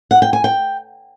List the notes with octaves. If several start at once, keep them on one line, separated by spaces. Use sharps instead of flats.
F#5
G5
G#5
G5